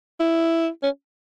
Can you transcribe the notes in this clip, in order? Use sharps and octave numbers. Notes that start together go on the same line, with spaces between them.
E4
C#4